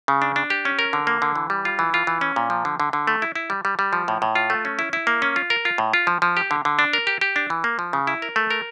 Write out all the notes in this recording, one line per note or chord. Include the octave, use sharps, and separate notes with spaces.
C#3
D4
D4
G4
C#4
A#4
D3
A#3
D3
E3
G3
F4
E3
F4
E3
C#4
A#2
F3
D3
D3
D3
A3
E4
E4
G3
G3
G3
F3
A2
A2
F4
A3
C#4
E4
E4
A#3
C#4
F4
A#4
F4
A2
F4
F3
F3
G4
D3
D3
D4
A#4
G4
G4
D4
E3
A#3
F3
C#3
E4
A#4
A3
A#4